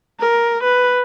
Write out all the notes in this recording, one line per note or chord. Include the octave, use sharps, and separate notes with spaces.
A#4
B4